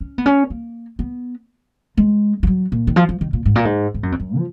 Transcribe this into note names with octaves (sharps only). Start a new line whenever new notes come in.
C#4
B3
C#4
A#3
B3
G#3
F3
F#3
A#2
D#3
F3
F3
D#3
A#2
G#2
A#2
G#2
G#2
F#2
F2
F#2
F3